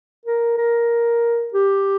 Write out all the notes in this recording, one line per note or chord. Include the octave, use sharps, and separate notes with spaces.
A#4
A#4
G4